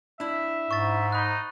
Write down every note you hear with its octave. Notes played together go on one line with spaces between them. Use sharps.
D4 E4 E5
G#2 C#6 A6
D#4 B5 F#6